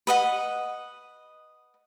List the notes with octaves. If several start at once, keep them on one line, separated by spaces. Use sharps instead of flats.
B4 D#5 F#5